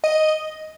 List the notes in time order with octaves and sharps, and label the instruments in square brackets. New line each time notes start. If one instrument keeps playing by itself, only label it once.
[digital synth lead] D#5